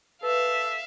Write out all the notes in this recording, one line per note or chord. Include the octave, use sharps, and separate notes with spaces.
A4 B4 E5 F5